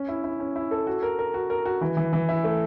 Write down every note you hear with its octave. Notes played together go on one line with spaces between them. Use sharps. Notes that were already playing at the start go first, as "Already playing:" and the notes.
Already playing: C#4
E4
E4
C#4
E4
A4
F#4
A#4
A#4
F#4
A#4
F#4
E3
E3
E3
E4
A3